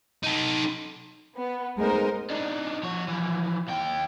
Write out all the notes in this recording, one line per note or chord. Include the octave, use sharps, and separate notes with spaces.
D#4 A4
B3
G#3 A3 B3 D#4 A#4 C5
D4 D#4
F3 C#5
E3 F3
D#2 G5